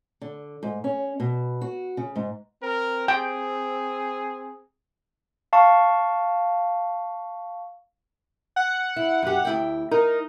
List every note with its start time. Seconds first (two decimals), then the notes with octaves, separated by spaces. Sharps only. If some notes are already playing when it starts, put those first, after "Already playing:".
0.22 D3
0.63 G#2
0.84 C#4
1.20 B2
1.61 F#4
1.97 C#3
2.16 G#2
2.62 C4 A#4
3.08 G#4 G5
5.53 F5 A5 C#6
8.56 F#5
8.96 E4
9.23 F#2 G4
9.45 D2 E4 G5
9.91 D#4 A#4